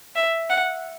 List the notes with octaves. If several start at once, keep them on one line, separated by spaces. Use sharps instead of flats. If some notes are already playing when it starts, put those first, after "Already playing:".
E5
F#5